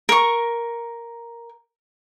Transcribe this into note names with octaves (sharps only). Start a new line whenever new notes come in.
A#4 C#6